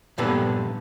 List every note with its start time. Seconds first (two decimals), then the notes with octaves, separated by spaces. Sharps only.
0.18 G2 A#2 D3 B3 A4 B4